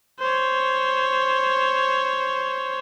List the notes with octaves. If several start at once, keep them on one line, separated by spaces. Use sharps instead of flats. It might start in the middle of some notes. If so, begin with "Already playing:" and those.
C5 C#5